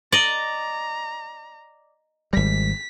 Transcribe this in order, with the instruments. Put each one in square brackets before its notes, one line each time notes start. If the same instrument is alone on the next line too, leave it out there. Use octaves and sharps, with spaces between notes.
[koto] D5 D#5 [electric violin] A#5
[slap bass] G#1 G3 [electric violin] B6